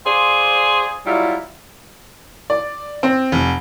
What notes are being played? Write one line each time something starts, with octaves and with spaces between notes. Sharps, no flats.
F4 G#4 C5 D5
F#3 G3 E4 F4
D5
C4
F1